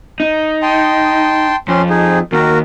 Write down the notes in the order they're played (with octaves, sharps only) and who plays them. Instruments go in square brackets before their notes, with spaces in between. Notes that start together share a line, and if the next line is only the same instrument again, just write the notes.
[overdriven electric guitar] D#4
[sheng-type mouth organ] G5 A5 C6
[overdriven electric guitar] F2 [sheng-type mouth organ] C#4 C6
[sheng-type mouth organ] D#4 G#4
[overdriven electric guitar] D#2 [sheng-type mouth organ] F#4 A#4